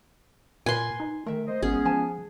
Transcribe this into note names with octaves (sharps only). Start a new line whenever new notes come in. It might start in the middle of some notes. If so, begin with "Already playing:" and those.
A#2 F4 A#4 B4 G#5 C6
D#4
D#3 A3 A#4 E5
C5 D#5
G#1 G#3 B3 C#4 G#4
F3 G#5 A5